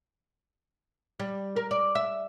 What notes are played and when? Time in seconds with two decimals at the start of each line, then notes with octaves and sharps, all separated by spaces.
1.20 G3
1.56 A#4
1.71 D5
1.95 E5